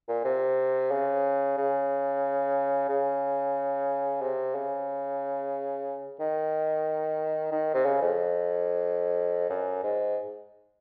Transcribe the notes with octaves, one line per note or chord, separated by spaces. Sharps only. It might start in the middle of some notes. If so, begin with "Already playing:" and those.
A#2
C3
C#3
C#3
C#3
C3
C#3
D#3
D#3
C3
C#3
F2
F#2
G#2